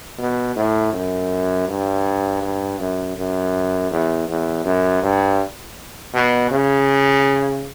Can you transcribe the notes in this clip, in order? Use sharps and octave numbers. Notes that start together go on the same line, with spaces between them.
B2
A2
F#2
G2
G2
F#2
F#2
E2
E2
F#2
G2
B2
C#3